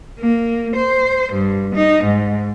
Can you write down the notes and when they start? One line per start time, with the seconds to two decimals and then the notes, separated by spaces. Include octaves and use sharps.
0.20 A#3
0.76 C5
1.33 G2
1.76 D#4
2.04 G#2